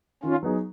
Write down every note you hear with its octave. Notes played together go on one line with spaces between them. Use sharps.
D#3 C#4 F4
F#3 B3 D#4 G#4